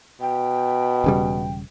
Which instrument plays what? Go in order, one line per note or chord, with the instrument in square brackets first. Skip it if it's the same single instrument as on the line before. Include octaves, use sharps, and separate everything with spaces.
[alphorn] B2 [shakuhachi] G5
[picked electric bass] E1 C#3 G3